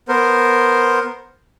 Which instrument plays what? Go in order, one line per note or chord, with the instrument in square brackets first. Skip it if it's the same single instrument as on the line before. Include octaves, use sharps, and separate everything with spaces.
[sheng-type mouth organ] B3 A#4 C5